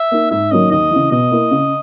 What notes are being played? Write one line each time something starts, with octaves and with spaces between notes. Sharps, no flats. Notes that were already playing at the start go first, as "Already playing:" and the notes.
Already playing: E5
A#3 D#4
G#2 E5
D#3 F#3 A#3 C#4 D#5
D#2 D#5
C#3 E3
B2 D#5
A#3 E4
C#3